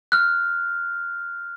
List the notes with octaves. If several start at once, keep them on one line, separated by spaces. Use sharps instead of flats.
F6 F#6